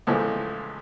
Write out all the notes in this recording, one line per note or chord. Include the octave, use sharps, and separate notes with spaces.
C#2 A2 E3 F3 G#3 A3